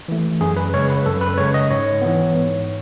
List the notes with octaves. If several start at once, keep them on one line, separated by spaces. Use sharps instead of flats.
E3 A3
F#2 G#4
B4
C#3 G#3 C#5
B4
F#2 A4
B4
C#3 G#3 C#5
D#5
G#2 C#5
E3 B3
G#2